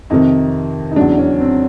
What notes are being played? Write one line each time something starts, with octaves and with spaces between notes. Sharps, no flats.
F2 C3 D#3 D#4
D#4
E2 C#3 F#3 D4
C#4
C4